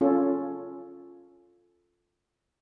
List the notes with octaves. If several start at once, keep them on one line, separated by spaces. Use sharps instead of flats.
C#4 F4 A4